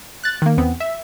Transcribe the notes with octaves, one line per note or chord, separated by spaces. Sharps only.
F#6 A6
D#3 A#3
E2 B3 C4
E5